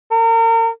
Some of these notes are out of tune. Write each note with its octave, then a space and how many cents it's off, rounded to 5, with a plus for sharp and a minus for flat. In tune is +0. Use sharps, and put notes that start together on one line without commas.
A#4 -35